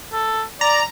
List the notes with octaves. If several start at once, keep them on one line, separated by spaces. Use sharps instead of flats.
A4
D5 A#5